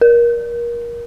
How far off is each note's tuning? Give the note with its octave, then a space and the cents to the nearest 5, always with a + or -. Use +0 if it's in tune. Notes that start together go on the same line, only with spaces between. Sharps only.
A#4 +25